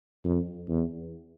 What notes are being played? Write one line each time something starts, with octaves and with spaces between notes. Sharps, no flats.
F2
E2